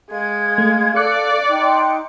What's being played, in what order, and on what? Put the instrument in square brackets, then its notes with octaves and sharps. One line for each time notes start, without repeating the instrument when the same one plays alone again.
[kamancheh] G#3 [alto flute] F5 [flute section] G#6
[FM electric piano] A3
[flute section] A4 [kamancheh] D5 [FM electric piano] D6 F#6 C#7
[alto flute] D#4 [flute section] G5 C6